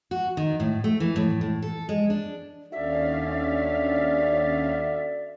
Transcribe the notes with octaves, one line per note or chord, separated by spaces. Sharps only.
F#4
D#3
A2
A3
E3
A2
A2
A4
G#3
D4
D#2 C#4 D4 F#4 A4 D5 E5 F5